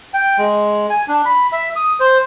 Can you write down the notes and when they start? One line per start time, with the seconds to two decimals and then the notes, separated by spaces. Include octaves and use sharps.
0.14 G5
0.38 G#3
0.90 G#5
1.08 D4
1.26 B5
1.52 E5
1.76 D#6
2.00 C5